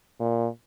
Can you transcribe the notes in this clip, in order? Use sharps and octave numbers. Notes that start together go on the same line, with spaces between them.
A#2